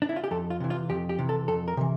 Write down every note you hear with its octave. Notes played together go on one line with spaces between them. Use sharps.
D4
E4
F4
G4
F2 A4
F4
C3 E3
F4
F2 G4
G4
C3 E3
A4
F2 A4
A#4
C3 E3